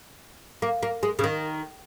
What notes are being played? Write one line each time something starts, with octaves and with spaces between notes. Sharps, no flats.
A#3
A#3
G#3
C#3
D#3